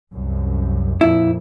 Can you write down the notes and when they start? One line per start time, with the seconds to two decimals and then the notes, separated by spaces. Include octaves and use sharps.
0.14 C2 F#2
1.01 F2 A#2 F3 E4